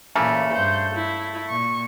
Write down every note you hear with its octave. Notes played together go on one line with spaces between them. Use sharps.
A#2 C#3 E3 A3 A#3
G2 C5 G6
E4
A#2 C#6